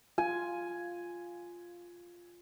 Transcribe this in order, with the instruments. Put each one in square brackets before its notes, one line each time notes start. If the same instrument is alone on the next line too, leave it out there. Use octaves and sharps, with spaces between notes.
[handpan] F4 [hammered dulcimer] G#5